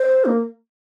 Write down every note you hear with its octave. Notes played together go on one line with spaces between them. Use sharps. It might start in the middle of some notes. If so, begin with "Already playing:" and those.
Already playing: C5
A#3